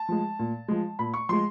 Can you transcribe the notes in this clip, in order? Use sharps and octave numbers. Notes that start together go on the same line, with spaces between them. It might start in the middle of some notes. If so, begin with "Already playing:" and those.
Already playing: A5
F3 G#3
A#2
F3 G#3
A#2 B5
C#6
F3 G#3 C6